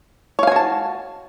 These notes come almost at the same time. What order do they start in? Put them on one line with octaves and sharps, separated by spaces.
C#5 F5 G#5 F#4 A5